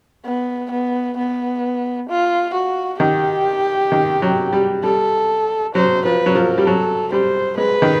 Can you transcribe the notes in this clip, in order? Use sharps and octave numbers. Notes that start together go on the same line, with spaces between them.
B3
B3
B3
F4
F#4
D#3 G4
D#3
F#3
G3
G3 A4
F#3 C5
F3 B4
F#3
F3 A#4
G3
F#3 A4
G3 C5
G#3 B4
D#3